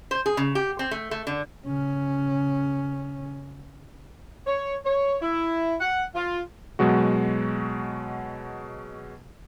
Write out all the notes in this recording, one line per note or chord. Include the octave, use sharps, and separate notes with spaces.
C5
G#4
C#3
G4
C4
A3
A3
D3
C#3 C#4
C#5
C#5
E4
F#5
F4
B2 F#3 G#3 F#4